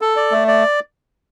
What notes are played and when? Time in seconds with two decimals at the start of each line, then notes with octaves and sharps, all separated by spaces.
0.01 A4
0.16 D5
0.32 A3
0.48 D5